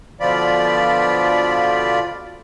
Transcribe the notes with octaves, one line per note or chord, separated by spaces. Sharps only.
B2 D3 F3 F4 D5 B5